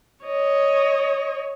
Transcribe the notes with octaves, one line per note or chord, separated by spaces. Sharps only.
C#5 D#5